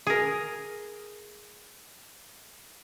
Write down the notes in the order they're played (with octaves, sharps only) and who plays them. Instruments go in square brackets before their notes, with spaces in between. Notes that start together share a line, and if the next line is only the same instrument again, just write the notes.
[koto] G#4 A#4